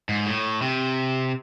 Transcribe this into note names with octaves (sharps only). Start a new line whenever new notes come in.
G#2
A2
C3